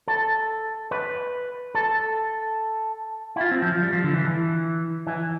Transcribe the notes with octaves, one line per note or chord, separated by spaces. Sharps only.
A4
B4
A4
E4
F4
C4
F3
F3
G3
F3
D3
E3
E3
E3